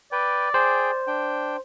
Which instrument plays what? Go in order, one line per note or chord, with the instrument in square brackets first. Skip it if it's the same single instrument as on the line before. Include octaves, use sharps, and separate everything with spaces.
[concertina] B4 G5 [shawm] D5
[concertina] G#4 G5 [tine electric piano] C5
[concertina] D4 G5